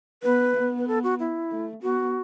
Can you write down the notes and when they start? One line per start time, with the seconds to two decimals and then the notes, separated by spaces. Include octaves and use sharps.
0.23 B3 B4
0.56 B3
0.78 B4
0.87 A4
1.03 F#4
1.19 E4
1.51 A3
1.82 B3 F#4